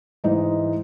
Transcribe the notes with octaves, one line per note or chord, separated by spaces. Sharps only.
G#2 E3 G#3 D#4